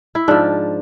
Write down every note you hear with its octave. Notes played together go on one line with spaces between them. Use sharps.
E4
G#2 F3 D4